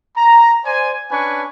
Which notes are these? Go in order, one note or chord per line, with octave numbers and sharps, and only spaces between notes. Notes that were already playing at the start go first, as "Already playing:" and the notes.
A#5
C5 D5 G#5
C#4 D4 B4 G#5 C#6